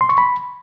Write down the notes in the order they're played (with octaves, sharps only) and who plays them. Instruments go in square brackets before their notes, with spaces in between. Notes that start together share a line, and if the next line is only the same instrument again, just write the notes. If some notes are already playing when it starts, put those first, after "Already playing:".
[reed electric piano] C6
C#6
B5